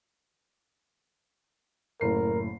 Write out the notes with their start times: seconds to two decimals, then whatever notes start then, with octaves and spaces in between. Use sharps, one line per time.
2.01 F#1 A2 A#4 C7